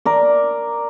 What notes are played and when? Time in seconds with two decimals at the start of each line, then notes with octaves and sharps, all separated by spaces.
0.06 A#4 D5